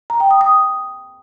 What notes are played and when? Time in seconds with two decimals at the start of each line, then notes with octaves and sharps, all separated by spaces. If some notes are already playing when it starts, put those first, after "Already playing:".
0.10 A#5
0.20 G5
0.31 D#6
0.41 D#6